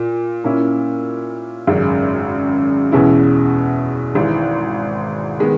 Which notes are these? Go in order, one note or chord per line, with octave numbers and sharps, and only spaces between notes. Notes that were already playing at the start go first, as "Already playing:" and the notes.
Already playing: A#2
A#2 A#3 C#4 E4
G#1 F#2 C#3 G#3
E2 B2 G#3 C#4 E4
G#1 G#2 E3
D#3 G#3 B3